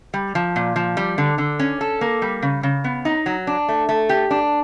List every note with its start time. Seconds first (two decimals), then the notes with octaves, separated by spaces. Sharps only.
0.14 G3
0.35 F3
0.56 A#2
0.76 F3
0.97 G3
1.18 D3
1.38 D3
1.59 C#4
1.81 A4
2.01 A#3
2.22 G3
2.42 C#3
2.63 C#3
2.84 B3
3.05 D#4
3.26 F#3
3.47 D4
3.68 A3
3.89 A3
4.09 G4
4.31 D4